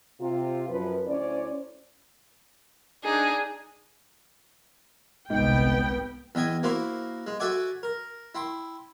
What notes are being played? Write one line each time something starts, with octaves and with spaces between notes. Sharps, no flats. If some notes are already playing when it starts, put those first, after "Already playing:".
C3 F4
F#2 F3 B4
D2 C#4 E4 C5 D5
D4 D#4 G#4
G1 C2 G#2 B3 G5
E2 D#5 G5 G#5 D#6
A#3 E4 F#4 A#4 C5
G#3
F#4 A4 E5 F#5 G#5 D6
A#4
E4 G5 C6